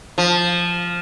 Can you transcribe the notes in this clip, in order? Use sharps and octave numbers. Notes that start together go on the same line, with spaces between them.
F3